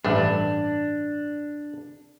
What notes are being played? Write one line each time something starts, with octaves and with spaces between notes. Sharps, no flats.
A1 G2 A3 D4